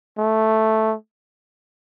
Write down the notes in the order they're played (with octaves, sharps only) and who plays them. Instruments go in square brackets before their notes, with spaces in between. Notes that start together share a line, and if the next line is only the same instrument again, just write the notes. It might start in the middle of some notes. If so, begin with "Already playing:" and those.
[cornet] A3